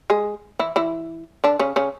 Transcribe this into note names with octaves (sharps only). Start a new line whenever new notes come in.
G#3 G#4
E3 E4
E3 E4
D3 D4
C#3 C#4
C#3 C#4